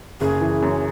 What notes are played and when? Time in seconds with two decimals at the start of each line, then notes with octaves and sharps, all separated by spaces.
0.21 F#1 G#4
0.41 E3
0.62 F#2